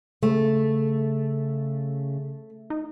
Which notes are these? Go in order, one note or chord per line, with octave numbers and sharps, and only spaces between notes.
C#3 A3
D#4